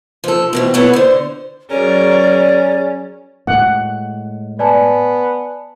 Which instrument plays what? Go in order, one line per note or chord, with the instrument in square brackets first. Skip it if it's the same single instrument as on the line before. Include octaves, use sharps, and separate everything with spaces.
[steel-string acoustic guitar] F3 A4
B2 E3 C4
B3 E4 A4 B4 C#5 F#5
D3 C5
[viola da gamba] F#3 A#4 [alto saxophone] C#4 [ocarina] G#4 [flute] D5
[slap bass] A2 G#3 [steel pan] F#5
[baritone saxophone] B3 [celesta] D5 G#5 A5